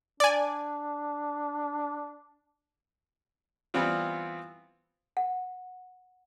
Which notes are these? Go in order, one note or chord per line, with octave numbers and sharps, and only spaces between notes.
D4 D5 G#5
E3 G3 B3 C4 F4
F#5